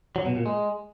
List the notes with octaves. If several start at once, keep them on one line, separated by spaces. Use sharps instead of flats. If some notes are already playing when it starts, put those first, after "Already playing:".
F#3
B2
A#2
G#3